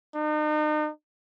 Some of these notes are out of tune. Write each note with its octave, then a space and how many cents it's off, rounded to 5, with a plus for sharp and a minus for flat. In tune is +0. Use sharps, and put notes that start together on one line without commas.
D#4 -40